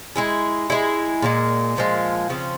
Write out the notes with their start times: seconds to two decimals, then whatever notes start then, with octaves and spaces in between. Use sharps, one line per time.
0.16 G#3 E4 G#4
0.70 G#3 E4 G#4
1.22 A#2 F3 G#3
1.77 A#2 F3 G#3
2.30 C#3 F3 C4